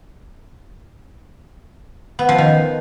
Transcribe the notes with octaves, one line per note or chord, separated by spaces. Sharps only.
B3
F3
D#3